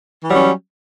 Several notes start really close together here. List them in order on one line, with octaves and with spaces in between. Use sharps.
E3 F#3 G3 C#4